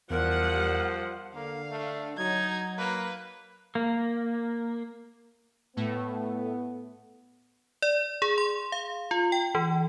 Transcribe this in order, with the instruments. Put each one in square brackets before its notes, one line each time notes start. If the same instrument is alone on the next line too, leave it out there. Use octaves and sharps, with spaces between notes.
[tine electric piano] E2 [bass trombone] F3 [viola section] G3 F#5 [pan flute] A#4
[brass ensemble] D3 [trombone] A#3 [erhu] F5
[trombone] A3
[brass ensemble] F#3 [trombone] D#4 [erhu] G#6
[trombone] A#3 [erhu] B4
[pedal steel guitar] A#3
[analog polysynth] A2 A3 [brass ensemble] B3
[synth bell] D5
G#4
C6
F5
F4
G5
E3